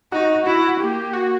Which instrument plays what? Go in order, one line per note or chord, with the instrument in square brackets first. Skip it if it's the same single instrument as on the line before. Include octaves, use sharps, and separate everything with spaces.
[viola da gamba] D#4 [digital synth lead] F#4
[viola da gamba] E4 [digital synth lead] F#4
[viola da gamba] A#3 [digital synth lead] G4
[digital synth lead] F#4